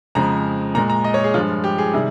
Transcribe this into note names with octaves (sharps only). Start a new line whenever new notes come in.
F2 C#3 F3 G#3 A#5
A#2 G#3 A#5
A#5
D#5
C#5
G#4
G2 F3 G#3 F4
G4
G#4
C3 D#3 G3